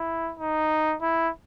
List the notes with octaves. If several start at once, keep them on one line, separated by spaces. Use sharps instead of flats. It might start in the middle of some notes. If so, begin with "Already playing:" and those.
Already playing: E4
D#4
E4